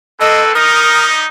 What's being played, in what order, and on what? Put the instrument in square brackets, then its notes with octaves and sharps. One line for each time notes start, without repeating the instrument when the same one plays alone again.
[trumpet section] A#3 C4 B4 [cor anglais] A4 [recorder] D#5
[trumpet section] G3 D#4 [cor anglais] A#4 [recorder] D#6